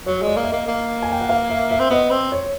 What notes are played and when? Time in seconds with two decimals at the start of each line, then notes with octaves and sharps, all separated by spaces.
0.06 F#3 C#5
0.22 G#3 D5
0.37 A#3
0.43 E5
0.47 D#5
0.53 A#3
0.68 A#3
1.02 G#5
1.11 G5
1.21 F#5
1.29 F5
1.50 E5
1.70 E5
1.79 C4
1.90 B3 D#5
2.11 C4
2.32 C#5